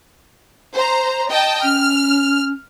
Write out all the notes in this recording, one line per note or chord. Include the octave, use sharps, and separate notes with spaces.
C5 A#5
D#5 G5 A5
C#4 F6